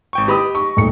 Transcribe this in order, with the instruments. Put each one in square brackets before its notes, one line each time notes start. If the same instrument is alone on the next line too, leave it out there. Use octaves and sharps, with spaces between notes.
[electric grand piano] G#1 G5 C#6
[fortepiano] G4 B5 D#6 [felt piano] B4 [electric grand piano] D#5
[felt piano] C#6
D#1 A3 C#7